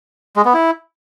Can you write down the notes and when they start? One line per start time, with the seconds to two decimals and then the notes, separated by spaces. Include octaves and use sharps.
0.36 G#3
0.45 B3
0.54 E4